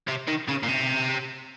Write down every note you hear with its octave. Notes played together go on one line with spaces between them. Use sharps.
C3
D#3
C#3
A#2
C3